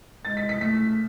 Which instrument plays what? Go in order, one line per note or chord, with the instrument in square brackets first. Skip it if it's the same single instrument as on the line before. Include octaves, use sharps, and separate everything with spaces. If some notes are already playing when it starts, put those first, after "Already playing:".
[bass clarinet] G#3 [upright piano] A6
[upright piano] B6
B6
[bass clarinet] A3 [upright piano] B6